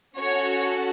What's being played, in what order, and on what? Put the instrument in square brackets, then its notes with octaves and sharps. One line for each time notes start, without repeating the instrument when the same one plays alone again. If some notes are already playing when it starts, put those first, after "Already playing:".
[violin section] C#4 F#4 A4 C#5